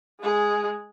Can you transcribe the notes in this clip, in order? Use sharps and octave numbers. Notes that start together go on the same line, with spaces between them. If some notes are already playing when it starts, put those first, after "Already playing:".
G#3 G#4